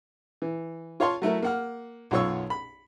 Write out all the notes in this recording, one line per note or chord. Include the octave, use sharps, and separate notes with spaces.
E3
F4 C#5 F5 A5 C6 C#6
F#3 A3 E4 A#4
A#3 F#5 F6
B1 F#2 F4 C#5 C#6 E6
B5